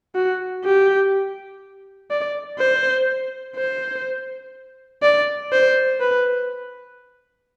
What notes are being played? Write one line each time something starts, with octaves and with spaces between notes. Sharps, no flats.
F#4
G4
D5
C5
C5
D5
C5
B4